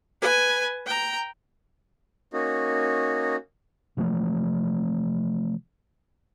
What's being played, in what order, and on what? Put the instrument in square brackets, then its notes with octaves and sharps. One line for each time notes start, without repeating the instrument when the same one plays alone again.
[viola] B4 G#5
G5 A#5
[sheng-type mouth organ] A#3 C#4 D#4 F#4
[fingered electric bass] C3 E3 F3 A3